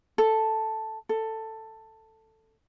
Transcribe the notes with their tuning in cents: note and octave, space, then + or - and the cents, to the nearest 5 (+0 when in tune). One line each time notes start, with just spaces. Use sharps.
A4 +0
A4 +10